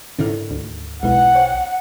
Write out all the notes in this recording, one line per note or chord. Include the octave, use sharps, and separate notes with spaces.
G#2 D3 D#3 C#4 E4 F6
D2
B1 G#3 E4 B4 F#5
C5 C#5 G5